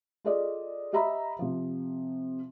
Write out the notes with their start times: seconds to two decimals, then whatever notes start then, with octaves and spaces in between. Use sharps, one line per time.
0.25 F4 G#4 A4 D5 D#5
0.93 G4 D#5 E5 A#5 B5
1.39 C3 F3